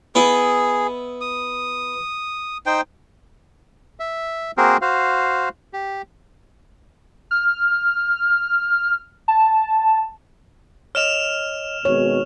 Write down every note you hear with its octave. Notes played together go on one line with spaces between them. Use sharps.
B3 E4 G#4 D#5
D#6
D#4 C5 G5
E5
A#3 C4 F#4 G#4 A#4 C5
F#4 C5 F5
G4
F6
A5
C#5 D#5 F6 E7 F7
G#1 G#2 B2 C#5